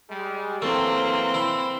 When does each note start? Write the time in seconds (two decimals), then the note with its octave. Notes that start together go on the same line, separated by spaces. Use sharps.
0.10 G3 G#3
0.62 E3 F#3 A3 A#3 C4
1.34 E4